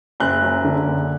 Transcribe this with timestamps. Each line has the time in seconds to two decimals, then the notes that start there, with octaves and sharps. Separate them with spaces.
0.20 F#1 F#6
0.42 F#2
0.64 D3
0.86 F#1